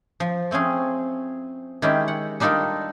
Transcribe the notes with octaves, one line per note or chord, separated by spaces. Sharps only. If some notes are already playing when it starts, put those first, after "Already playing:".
F3
A3 C4 C#4 G#4
D#3 G#3 C#4 E4 G4
F#5
G3 D4 D#4 F4 A4 A#4